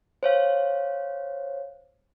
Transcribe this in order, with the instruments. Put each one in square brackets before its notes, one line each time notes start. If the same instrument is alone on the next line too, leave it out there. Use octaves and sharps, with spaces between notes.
[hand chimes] C5 C#5 F5